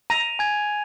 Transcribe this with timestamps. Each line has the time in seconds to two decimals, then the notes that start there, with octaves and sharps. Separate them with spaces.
0.10 A#5 D#7 F7
0.39 G#5 G#6